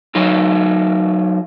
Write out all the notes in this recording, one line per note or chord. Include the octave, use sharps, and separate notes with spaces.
F#3 D#4 F4